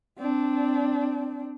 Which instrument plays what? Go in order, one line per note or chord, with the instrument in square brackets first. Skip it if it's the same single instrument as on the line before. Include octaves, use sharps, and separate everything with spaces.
[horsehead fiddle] C4 D4